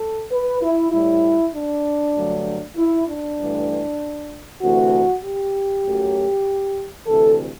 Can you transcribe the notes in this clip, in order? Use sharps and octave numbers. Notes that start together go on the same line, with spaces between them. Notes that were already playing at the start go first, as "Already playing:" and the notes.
Already playing: A4
B4
E4
A2 G3 E4
D4
G2 D3 F#3 A3
E4
D4
G2 E3 A3
D2 C3 E3 A3 F#4
G4
F#2 F#3 A3
D2 C3 E3 A4